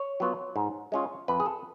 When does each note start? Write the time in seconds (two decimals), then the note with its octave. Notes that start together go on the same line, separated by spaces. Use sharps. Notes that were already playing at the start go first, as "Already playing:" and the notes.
Already playing: C#5
0.20 F#3 B3 F4
0.56 G#2
0.92 G#3 C#4 F4
1.28 F2 B4
1.40 G#4
1.46 A4